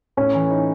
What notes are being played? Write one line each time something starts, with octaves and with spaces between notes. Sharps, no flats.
A2 C#4
E3
D#4